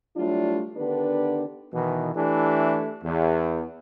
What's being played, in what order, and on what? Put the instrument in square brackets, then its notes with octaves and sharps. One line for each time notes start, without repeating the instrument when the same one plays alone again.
[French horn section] F#3 G3 A3 D4 E4 F4
D3 D#3 B3 D4 G4 B4
[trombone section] B2 D#3 E3
E3 A3 D4 E4 G4
E2